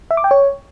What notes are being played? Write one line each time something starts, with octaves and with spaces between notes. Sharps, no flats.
E5
D6
G5
C#5